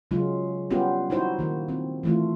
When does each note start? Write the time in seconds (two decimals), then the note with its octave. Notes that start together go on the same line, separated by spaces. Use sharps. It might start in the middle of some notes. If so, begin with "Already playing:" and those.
0.11 C#3 F#3 G#3 F4
0.70 G3 B3 C#4 F4 G4
1.10 D#4 E4 F#4 C5
1.39 D#3 A#3
1.68 C4
2.03 E3 A3 F4